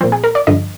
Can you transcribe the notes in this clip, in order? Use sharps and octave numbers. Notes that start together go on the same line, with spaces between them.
A#2 F3 C4
G#4
A#4
D5
G2 D3 F3 D#5